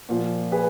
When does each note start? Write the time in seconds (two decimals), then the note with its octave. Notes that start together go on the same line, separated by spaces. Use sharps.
0.09 A#2 F3
0.52 G#4 B4